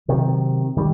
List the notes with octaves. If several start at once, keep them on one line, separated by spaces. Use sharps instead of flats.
C3 D#3 F#3
D#3 G3